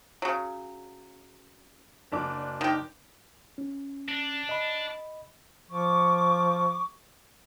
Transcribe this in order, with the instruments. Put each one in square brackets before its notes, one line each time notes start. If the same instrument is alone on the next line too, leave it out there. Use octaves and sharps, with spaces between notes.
[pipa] C#3 F#3
[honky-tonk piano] F#1 D4 D6
[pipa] D#3 G4
[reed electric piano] C#4
[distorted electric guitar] D4
[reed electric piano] D#5 B5
[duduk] F3 [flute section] C#6 D6